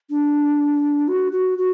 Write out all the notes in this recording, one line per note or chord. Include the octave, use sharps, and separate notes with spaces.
D4
F#4
F#4
F#4